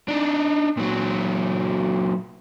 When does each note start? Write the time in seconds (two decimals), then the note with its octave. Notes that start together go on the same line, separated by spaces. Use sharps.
0.08 D4 D#4
0.78 A#2 F#3